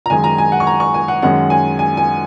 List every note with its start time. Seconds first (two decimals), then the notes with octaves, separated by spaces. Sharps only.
0.06 A#5
0.10 F#2 D#3 G#3 G#5
0.24 A#5
0.38 G#5
0.52 F#5
0.60 C#6
0.67 A#5
0.80 C#6
0.94 G#5
1.08 F#5
1.22 F#2 D#3 G#3 C#4 F#5
1.50 G#5
1.79 G#5
1.97 G#5